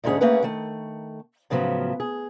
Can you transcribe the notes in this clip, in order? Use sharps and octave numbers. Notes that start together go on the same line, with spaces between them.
D2 G#2 D3 C#4 G#4 F#5
A3 A#3 C#4 G#4 B4 F#5
D#3 A3
A2 C#3 F3 F#3 B3
G#4